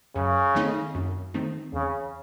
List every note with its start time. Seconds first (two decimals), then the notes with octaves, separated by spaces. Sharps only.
0.15 F#2 C#3
0.55 D#3 A3 C4 D#4
0.95 F#2
1.34 D#3 A3 C4 D#4
1.73 E2 C#3